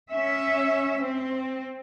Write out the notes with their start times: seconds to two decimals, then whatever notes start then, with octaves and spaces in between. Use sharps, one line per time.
0.10 C#4 E5
1.00 C4